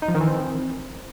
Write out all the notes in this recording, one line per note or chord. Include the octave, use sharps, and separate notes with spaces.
D#4
F3
D#3
E3
C4